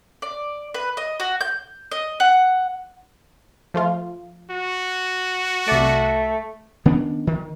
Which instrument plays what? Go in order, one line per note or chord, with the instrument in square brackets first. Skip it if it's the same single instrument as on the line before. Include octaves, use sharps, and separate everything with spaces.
[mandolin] D5
B4
D#5
F#4
G6
D#5
F#5
[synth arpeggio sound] F3 A3 F4
[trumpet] F#4
[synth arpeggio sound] C2 D5 [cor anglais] A3
[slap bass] D#3 B3 C#4 D4
D#3